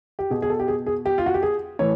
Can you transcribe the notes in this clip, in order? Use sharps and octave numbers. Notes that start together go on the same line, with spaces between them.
G4
B2 G#4
G#4
A4
G4
G#4
G#4
G4
F4
F#4
G4
G#4
A2 E3 C#5